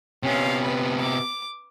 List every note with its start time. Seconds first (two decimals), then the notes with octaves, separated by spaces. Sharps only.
0.23 C3 B3 C#4 F5
0.62 B4
1.01 D6